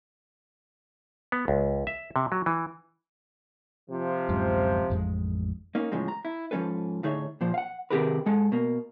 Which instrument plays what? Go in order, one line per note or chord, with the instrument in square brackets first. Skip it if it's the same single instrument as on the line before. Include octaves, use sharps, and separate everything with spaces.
[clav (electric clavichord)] B3
C#2
E5
C3
F#3
E3
[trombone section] C3 F3
[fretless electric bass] D1 F#2 G#3
A1 F2 G#3
[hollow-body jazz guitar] A#3 C#4 D#4
A2 C#3 E3 F3 G#3
A#5
E4
G#2 F3 G#3 C#4 A4 B4
A2 D3 D#4 G#4 C#5 E5
A#2 F3 C5
F5 F#5
C3 D#3 G4 G#4 A#4 B4
G#2 G#3 A4 G#5
B2 A#3